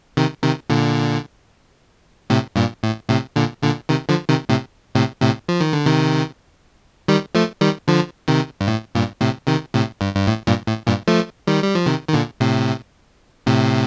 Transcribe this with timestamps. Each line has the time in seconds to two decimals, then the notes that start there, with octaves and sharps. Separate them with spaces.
0.17 C3 D#3
0.43 C3 D#3
0.70 A#2 D3
2.30 A2 C3
2.56 G2 A#2
2.83 A2
3.09 A2 C3
3.36 A#2 D3
3.63 A#2 D3
3.89 C3 D#3
4.09 D3 F3
4.29 C3 D#3
4.49 A2 C3
4.95 A2 C3
5.22 A2 C3
5.49 F3
5.61 D#3
5.73 D3
5.86 C3 D#3
7.08 D#3 G3
7.35 F3 A3
7.61 D#3 G3
7.88 D3 F3
8.28 C3 D#3
8.61 G2
8.68 A2
8.95 G2 A#2
9.21 A2 C3
9.47 C3 D#3
9.74 A2 C3
10.01 G2
10.15 G2
10.27 A2
10.47 G2 A#2
10.67 A2
10.87 G2 A#2
11.08 F3 A3
11.47 D#3 G3
11.63 G3
11.75 F3
11.86 C3 D#3
12.09 D#3
12.13 A#2 D3
12.40 A2 C3
13.46 A2 C3